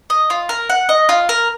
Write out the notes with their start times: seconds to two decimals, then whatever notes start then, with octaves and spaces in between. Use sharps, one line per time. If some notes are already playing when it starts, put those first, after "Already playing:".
0.10 D#5
0.30 F4
0.49 A#4
0.70 F#5
0.89 D#5
1.09 F4
1.29 A#4